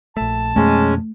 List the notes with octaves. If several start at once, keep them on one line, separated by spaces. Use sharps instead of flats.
A#1 A3 A5
F2 B2 G#3 A3 C#4